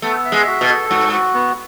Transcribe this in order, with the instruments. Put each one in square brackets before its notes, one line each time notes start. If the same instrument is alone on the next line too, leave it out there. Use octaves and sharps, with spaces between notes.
[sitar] A3 [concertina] B3
[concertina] E5
[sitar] G#3
[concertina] F#4
[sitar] B2
[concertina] A4
[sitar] G#2 [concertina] F#4
[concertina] F#4
B3